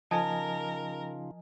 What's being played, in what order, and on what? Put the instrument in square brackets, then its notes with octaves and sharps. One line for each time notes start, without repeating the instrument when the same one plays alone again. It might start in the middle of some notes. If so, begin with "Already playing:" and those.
[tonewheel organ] C#3 D#4 F4 [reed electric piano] F3 D#5 G#5 [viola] A#4 [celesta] A5